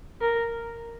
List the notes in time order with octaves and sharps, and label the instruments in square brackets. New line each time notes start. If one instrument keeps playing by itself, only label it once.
[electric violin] A#4